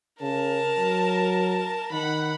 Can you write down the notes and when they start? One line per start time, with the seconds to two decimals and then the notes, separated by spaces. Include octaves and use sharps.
0.22 C#3 A#4 A5
0.79 F#3
1.92 D#3 F#5 B5